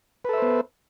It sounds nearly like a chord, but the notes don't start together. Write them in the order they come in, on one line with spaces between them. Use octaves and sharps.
B4 A4 E5 C5 B3